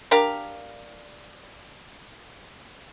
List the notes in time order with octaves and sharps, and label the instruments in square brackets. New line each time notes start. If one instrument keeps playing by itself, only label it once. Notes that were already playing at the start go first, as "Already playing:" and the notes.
[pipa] D4 G4 A#4 F5